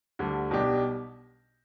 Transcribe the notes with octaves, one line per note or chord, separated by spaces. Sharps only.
D2 D3 G3
B1 B2 G3 D4 G4